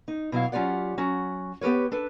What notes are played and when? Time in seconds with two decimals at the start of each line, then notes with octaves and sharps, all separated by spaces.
0.08 D#4
0.32 B2 F#3 E4 F5
0.52 F#3 C#4 F4 G4 D5 F#5
0.98 F#3 C#4 F#4
1.61 B3 G4 A#4 B4 C#5
1.92 D4 A4 B4